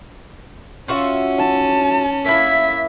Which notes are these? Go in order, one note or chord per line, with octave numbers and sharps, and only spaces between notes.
C#4 F4 F#4 E5
A5
A#3 E4 E5 B6